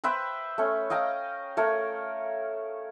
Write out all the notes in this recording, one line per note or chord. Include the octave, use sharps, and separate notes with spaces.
B4 C5 E5 G5
A3 C#4
D#5 F5 G5 A#5
A3 A#4 C#5